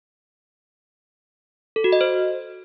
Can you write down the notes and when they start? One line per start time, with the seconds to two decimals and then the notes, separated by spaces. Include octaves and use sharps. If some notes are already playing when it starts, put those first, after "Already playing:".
1.76 A4
1.84 F#4
1.92 D#5
2.01 C5